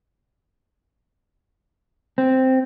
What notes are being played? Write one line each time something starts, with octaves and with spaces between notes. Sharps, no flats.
C4